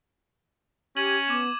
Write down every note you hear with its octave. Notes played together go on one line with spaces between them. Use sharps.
C#4 G4 G#6 D#7 F#7
B3 D6 E7